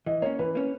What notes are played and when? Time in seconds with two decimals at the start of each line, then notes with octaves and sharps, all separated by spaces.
0.06 E3 D#5
0.22 A#3 C#4 C#5
0.39 E3 B4
0.55 A#3 C#4